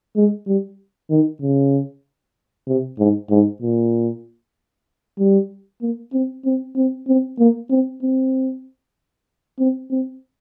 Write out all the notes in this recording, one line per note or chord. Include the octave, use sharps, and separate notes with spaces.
G#3
G3
D#3
C#3
C3
G#2
G#2
A#2
G3
A#3
C4
C4
C4
C4
A#3
C4
C4
C4
C4